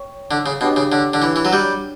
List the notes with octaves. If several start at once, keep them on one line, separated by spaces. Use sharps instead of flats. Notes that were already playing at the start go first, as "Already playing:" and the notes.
Already playing: C#5 G5 C#6
D3
C#3
B2 D4 G4 C#5 G5 D6
C#3
D3
D3
E3
E3
F#3
G3